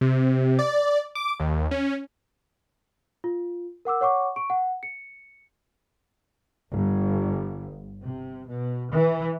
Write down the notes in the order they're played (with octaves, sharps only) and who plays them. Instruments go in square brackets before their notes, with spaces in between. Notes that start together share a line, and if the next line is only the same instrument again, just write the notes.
[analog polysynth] C3
D5
D6
D#2
C#4
[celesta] F4
A#4 F#5 D6 E6
C#5 F#5 C#6 D6
C#6 D7
F#5
C#7
[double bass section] G1
C3
B2
E3